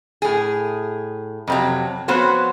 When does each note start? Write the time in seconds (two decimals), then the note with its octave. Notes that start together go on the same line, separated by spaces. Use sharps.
0.22 A2 G#4
1.48 F2 C3 F#3
2.08 F3 B3 C4 F#4 C5 C#5